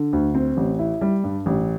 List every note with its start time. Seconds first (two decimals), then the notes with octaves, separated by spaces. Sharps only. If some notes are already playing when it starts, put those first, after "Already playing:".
Already playing: D3
0.13 D2
0.35 C4
0.57 A1
0.79 E4
1.01 G3
1.24 G2
1.46 A1